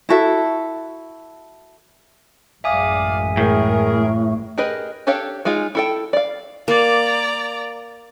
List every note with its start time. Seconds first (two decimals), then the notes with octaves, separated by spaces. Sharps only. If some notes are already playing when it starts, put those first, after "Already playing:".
0.09 E4 F#4 A4 E5
2.64 A1 F#2 G#3 D5 E5 F5 G#5 D#6
3.37 A2 G#4 A#4
4.58 G4 G#4 A#4 B4 D#5
5.07 D4 G4 A4 C#5 F5
5.45 G#3 D#4 F4 G#4
5.75 E4 A4 G5
6.13 D5 F5
6.68 A#3 D5 A#5